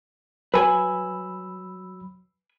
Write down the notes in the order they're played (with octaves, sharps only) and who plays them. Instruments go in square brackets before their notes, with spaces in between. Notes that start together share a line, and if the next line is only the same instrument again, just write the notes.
[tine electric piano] F#3 B5 E6 [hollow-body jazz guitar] B4 G#5